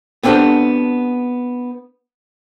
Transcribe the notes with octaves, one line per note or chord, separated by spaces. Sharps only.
B3 C4 D4 F4 G4 A4